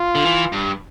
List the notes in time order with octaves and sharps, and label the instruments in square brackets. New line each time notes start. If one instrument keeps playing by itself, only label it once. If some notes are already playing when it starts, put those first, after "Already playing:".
Already playing: [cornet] F4
[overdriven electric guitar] D3
E3
G2